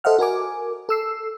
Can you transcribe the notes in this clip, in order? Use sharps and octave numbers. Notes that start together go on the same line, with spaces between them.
A4 C5 D#5 E5 F#5 F6
F#4 A#4 G#5 D6
A4 E6 C7